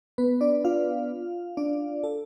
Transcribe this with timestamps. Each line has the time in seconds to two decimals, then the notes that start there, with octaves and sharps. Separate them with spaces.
0.18 B3 B4
0.41 D4 D5
0.64 F4 F5
1.57 D4 D5
2.04 A4